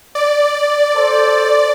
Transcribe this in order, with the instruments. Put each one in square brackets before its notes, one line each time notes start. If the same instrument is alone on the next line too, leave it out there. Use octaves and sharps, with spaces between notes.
[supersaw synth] D5
[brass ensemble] A4 C5